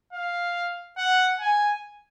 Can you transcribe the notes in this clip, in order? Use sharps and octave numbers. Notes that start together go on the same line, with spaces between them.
F5
F#5
G#5